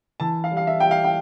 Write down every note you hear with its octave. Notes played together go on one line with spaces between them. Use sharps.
E3 A5
F5
G3
F5
E5
G3 G5
F5
G5